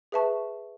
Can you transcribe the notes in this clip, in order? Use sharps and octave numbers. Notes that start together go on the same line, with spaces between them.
G#4 B4 E5 A5 C#6